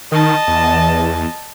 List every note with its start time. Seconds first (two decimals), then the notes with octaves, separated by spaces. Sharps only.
0.12 D#3 D#5 A5
0.47 E2